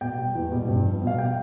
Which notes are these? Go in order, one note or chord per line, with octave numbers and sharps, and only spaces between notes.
B2 G5
G3
E2
B2 G3
G2
F3
B2
F5
G3 G5